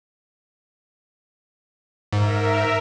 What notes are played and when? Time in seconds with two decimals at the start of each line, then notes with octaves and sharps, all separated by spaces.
2.13 G#2 A#4 E5